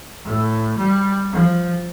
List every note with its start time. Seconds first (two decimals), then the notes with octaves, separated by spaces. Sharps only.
0.24 A2
0.78 G3
1.32 F3